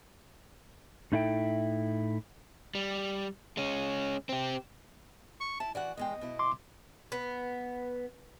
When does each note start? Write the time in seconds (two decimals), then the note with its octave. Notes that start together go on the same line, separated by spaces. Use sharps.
1.12 A2 D#4 E4 A4 E5 G5
2.75 G3
3.57 G#3 C#4
4.29 C4 G4
5.41 C#6
5.60 E4 A5
5.75 E3 F#4 D5 F#5
5.97 E2 G#3 D#5 G5
6.21 B2 E4
6.39 C6 D6
7.12 B3